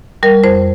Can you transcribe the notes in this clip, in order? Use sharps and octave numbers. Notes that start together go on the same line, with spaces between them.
G3 A#4
F2 C5